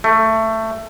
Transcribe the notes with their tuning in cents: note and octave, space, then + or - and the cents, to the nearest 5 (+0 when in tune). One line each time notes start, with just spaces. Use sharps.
A3 +15